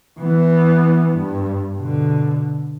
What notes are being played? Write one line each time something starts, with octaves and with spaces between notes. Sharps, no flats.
E3 B3
G2
B2 D3